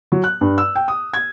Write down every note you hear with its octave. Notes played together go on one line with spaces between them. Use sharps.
F#3
F#6
G2
E6
G5
D#6
G#6